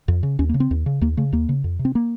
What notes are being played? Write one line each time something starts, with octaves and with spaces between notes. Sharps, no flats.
F2
C#3
D#2 C#4
A#3
C#3
C4
D#2
C#3
D#2 A#3
C#3 A3
D#2 A#3
C#3
F2
C3
C4
A#3